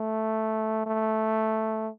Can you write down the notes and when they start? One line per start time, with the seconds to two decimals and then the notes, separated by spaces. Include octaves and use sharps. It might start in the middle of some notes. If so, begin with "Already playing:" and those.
Already playing: A3
0.86 A3